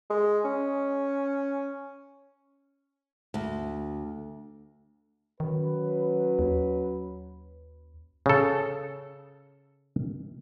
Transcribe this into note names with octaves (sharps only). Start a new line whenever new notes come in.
G#3
C#4
D2
D#3 F#3 C#4 B4
D#2
C#3 A4